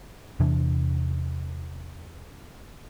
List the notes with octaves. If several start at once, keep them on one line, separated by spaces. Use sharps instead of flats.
E2 C3 E3 D4